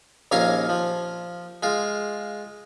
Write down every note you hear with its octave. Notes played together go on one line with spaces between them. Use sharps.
A#1 D#2 C#4 A#4 F5 G#5
F3
G#3 F4